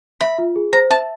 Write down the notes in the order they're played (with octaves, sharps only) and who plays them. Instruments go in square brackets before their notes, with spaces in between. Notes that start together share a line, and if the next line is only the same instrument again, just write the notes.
[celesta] E5 [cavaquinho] B5
[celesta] F4
G#4
[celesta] C5 [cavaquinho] A#5
[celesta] E5 [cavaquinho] A5